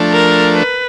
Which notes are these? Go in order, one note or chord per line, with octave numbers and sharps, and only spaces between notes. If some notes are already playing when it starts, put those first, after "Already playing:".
Already playing: F3 A3 D4
A#4
B4